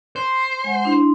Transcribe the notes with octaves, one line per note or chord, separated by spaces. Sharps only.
C5
G#3 F#5
D4 E4 C6